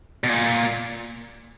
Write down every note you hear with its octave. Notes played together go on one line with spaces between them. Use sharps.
B2
A#2